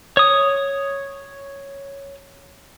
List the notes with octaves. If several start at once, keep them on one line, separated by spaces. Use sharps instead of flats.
C#5 D#6